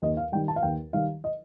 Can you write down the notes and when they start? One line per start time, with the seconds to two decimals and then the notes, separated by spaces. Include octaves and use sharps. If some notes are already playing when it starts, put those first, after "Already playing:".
0.02 D#2 D#5
0.17 F5
0.32 D#3 G3 G5
0.48 A5
0.56 F5
0.63 D#2 G5
0.93 D#3 G3 F5
1.24 D#5